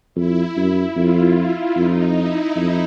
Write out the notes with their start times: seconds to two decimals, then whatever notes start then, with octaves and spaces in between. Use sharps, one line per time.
0.16 F2 E4
0.56 F#2
0.96 F2 F4
1.76 F2 D#4
2.16 E4
2.56 F2